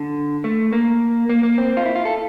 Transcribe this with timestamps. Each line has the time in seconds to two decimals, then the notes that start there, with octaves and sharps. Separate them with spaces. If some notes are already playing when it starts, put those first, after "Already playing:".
Already playing: D3
0.44 A3
0.73 A#3
1.29 A#3
1.43 A#3
1.58 C4
1.77 F4
1.86 E4
1.96 F4
2.05 A4